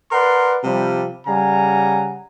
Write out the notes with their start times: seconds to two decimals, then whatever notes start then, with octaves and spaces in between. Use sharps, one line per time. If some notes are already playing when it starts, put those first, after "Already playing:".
0.12 A#4 B4 D5 F#5 C6
0.64 C3 F3 G3
1.26 C#3 G3 F#5 G#5 A#5